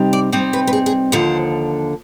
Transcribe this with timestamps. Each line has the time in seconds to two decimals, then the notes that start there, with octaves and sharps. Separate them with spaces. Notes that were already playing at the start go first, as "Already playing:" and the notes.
Already playing: C3 G3 C4 D#4
0.13 D5
0.32 C3 G3 C4 D#4 C5
0.53 B4
0.67 B4
0.73 G#4
0.86 G#4
1.12 D#2 D3 F3 C5